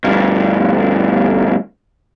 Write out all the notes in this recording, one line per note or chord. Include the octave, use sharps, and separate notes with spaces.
D2 G2